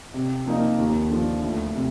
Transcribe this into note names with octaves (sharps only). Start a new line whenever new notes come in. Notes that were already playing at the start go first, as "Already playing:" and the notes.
C3
F3 A#3 D#4
D#2
D3 F3
D2
C3